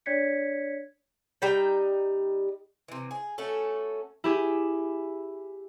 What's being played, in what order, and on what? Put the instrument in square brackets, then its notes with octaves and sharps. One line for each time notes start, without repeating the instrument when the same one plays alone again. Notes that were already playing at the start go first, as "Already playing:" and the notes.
[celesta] D4 C#5 D5 G#6 B6 C#7
[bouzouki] G3 D#4 G5
C3 E3
G#4
A3 C#4 F#4 A4
[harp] E4 G4 G#4